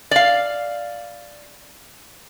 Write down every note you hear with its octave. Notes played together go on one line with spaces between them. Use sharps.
D5 F5